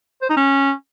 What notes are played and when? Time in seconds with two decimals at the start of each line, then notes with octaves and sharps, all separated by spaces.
0.22 C5
0.29 D#4
0.36 C#4